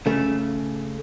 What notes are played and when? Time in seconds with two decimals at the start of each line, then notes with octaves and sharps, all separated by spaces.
0.06 C#3 A3